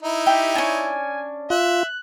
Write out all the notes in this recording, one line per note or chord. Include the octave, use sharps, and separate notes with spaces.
D#4 E4
G4 E5
C#4 D4 G#5
F4 E5 F#6